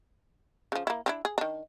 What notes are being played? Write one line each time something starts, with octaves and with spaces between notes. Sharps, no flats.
C#3 F3
A#3 E4
C4 D4 E4
G#4
D#3 D4